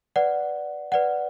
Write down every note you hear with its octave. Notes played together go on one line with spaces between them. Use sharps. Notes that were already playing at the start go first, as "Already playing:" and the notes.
B4 D5 F#5
B4 D5 F#5